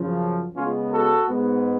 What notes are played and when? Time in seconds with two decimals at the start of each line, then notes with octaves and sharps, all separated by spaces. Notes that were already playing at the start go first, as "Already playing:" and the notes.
Already playing: F#2 C#3 F3
0.56 C#3 G#3 B3 C#4 F4
0.92 F#4 A4
1.29 G#2 G#3 B3